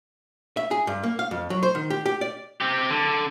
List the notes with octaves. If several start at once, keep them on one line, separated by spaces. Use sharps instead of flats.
E5
G#4
G2
A#3
F5
F2
F#3
C5
D#3
G4
G4
D5
C4 G4
D3